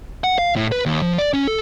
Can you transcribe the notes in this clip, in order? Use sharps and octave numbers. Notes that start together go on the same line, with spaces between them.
F#5
F5
A2
B4
D#2
F3
D5
C#4
A4